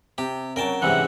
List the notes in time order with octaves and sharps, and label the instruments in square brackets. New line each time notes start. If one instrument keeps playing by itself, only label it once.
[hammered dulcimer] C3 [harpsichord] G4
[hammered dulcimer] C#3 F#3 [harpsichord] A#4 G5 A5
[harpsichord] G#2 C3 E3 [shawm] F#5